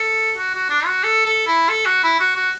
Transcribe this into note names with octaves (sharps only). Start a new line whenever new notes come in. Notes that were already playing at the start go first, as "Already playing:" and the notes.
Already playing: A4
F#4
F#4
D4
F#4
A4
A4
E4
A4
F#4
E4
F#4
F#4